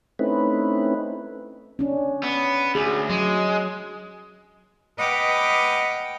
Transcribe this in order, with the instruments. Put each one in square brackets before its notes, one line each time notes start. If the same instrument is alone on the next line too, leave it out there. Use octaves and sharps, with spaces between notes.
[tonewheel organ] A3 C4 C#4 D#4 E4 B4
[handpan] C#4 D4
[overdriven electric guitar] B3
[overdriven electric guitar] D2 [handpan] G#4
[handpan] F#3 [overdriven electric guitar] G#3
[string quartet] B4 D#5 F#5 G5 D6 F6